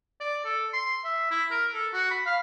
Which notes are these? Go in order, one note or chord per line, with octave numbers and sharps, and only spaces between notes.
D5
A4
C6
E5
E4
A#4
A4
F#4
B5
F5